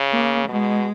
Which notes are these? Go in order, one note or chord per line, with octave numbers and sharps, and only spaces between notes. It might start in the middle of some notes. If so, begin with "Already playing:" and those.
Already playing: C#3
A#3
B2 G#3